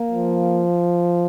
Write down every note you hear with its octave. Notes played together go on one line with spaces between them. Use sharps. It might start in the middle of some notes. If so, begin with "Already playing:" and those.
Already playing: A#3
F3